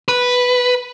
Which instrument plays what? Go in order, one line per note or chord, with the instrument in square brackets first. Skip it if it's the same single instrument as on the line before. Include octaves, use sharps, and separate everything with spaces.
[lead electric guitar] B4